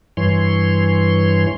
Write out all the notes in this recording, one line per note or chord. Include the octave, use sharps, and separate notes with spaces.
G2 E3 C#5 C6